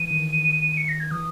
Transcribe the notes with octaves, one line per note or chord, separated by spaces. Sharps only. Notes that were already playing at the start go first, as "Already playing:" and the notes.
Already playing: E3 D#7
D#3
D#7
C#7
A#6
G#6
E3 D#6